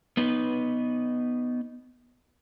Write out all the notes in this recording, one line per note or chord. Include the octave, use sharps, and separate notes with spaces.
B3 D#4 B4